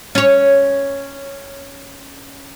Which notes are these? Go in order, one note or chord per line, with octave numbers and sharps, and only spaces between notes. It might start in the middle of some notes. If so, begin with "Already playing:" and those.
C#4 C#5